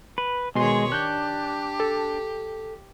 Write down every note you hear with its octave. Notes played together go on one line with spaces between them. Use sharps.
B4
B2 D#3 G#3 G#4 C#5 C6
D4 G4 F#6 G6
A4